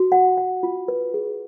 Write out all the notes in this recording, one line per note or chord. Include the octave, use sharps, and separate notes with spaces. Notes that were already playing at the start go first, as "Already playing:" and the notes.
Already playing: F#4
F#5
F#5
F4
B4
G#4